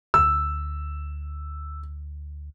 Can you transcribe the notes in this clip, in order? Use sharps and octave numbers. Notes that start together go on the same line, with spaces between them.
D2 E6